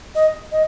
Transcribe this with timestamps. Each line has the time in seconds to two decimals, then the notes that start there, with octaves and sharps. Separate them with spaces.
0.15 D#5
0.52 D#5